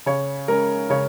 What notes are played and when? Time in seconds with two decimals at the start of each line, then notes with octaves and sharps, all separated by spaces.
0.06 C#3 C#5
0.48 G#3 C#4 A#4
0.90 C#3 C#5